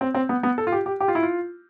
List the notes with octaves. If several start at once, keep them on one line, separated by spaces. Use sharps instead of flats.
C4
C4
B3
B3
A4
F4
G4
G4
G4
F4
E4
F4